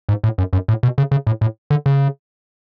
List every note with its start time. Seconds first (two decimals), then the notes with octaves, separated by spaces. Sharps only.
0.09 G#2
0.24 A2
0.38 F#2
0.53 F#2
0.68 A2
0.83 B2
0.98 C#3
1.11 C#3
1.27 A2
1.41 A2
1.70 D3
1.86 C#3